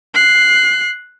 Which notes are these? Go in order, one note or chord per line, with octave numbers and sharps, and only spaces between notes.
F#6 C7